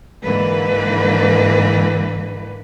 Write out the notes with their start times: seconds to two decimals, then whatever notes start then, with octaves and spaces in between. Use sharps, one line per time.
0.24 G#2 D3 E3 A#3 B4